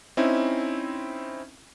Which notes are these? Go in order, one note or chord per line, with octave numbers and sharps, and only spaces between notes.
C4 C#4 D#4 E4